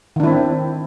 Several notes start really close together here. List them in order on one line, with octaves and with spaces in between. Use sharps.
D#3 D4 E4 C4